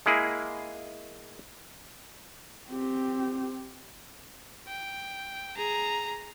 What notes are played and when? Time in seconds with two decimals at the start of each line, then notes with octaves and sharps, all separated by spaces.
0.06 G#3 A#3 E4 G#4
2.69 C4 G4
4.68 G5
5.56 G#4 A#5